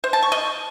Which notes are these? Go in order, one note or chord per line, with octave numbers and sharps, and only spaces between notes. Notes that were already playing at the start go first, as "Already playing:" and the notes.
C5
A5
C#6
D#5